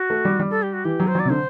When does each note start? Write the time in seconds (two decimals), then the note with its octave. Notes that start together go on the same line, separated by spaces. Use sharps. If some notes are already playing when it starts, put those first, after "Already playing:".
Already playing: F#4
0.10 A3
0.25 G3
0.39 G3
0.51 A4
0.62 G4
0.73 F#4
0.85 E3 G4
1.00 F#3
1.07 C5
1.15 F#3 D5
1.25 C3
1.30 D3 C5